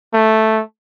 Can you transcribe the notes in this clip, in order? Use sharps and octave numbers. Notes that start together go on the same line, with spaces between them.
A3